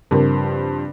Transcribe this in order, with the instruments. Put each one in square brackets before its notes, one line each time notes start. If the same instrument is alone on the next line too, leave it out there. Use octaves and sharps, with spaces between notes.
[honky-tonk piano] G2 F3 C4 [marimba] C#3 A#4